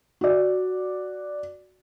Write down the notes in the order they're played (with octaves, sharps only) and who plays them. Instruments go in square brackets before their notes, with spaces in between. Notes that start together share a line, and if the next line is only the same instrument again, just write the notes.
[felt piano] F#4 D5